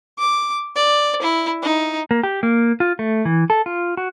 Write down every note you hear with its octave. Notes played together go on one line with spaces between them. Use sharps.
D6
D5
E4
D#4
A#3
G4
A#3
F4
A3
E3
A4
F4
F#4